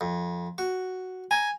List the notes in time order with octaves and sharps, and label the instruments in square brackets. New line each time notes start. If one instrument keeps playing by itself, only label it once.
[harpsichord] F2
F#4
[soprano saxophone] G#5 [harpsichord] A#5